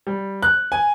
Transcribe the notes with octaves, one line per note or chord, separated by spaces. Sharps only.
G3
F#6
G#5